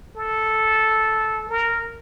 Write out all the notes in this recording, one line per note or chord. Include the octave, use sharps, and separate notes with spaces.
A4
A#4